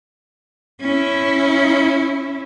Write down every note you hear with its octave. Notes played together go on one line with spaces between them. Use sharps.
C#4 E4